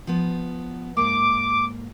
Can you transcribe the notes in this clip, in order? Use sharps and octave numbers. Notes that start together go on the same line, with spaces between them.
F3 B3
G#2 A#3 D6